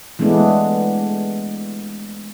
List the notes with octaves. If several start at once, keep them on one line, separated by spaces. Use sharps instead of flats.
E3 G#3 A3 B3 D4